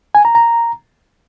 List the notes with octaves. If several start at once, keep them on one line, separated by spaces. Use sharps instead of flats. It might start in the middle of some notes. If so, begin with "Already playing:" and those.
G#5
A#5
A#5